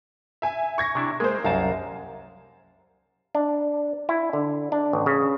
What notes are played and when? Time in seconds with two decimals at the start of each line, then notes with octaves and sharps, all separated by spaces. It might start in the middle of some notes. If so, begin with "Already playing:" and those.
0.42 E5 G#5
0.78 C#6 G#6 A#6
0.95 C3 D4 E4
1.20 G#3 A#3 C5
1.44 C2 F#2 F5 A5 A#5
3.35 D4
4.09 E4
4.33 D3
4.72 D4
4.93 A1
5.06 C#3